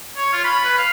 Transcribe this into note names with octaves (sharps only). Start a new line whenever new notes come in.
C#5
F4
B5
B4
F5